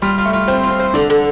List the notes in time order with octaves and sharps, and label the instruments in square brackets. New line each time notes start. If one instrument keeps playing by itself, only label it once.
[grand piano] G3 [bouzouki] F4
[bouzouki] F4
[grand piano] A3
[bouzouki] F4
[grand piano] C4 [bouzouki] C5
[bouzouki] F4
[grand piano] C4
[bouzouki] C5
[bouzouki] D3 [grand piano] D4
[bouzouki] D3